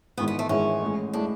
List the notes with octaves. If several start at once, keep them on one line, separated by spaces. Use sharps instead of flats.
G#1 G#2 E3 G#3 B3
B3
A3
G#1 G#2 E3 G#3 C#4
A1 A2 G#3
A2 G#3 D4